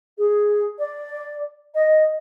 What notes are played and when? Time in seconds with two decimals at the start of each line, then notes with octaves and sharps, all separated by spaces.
0.18 G#4
0.78 D5
1.74 D#5